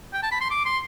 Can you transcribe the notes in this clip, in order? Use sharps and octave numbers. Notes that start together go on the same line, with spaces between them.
G5
A5
B5
C6
D6
C6